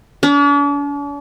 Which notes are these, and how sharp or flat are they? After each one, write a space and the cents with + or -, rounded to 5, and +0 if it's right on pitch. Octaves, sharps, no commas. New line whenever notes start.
D4 -45